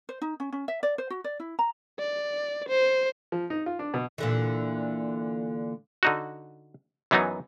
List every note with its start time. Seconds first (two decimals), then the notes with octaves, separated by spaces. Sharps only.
0.09 C5
0.21 D#4
0.40 C#4
0.52 C#4
0.68 E5
0.83 D5
0.98 C5
1.10 F#4
1.24 D5
1.40 E4
1.59 A#5
1.99 D5
2.69 C5
3.32 F3
3.50 D#4
3.66 F4
3.79 D4
3.94 B2
4.18 A#2 D3 E3
6.03 D3 D#4 F#4
7.11 F#2 E3 F#3 B3 D#4 G#5